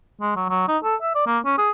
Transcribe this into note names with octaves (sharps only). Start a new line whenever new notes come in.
G#3
F#3
F#3
D#4
A4
E5
D5
A#3
C#4
G#4